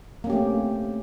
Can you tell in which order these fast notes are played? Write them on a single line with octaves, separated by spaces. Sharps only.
A#3 C#4 G4 A3 C4